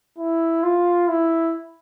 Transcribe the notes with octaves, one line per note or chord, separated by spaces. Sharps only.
E4
F4
E4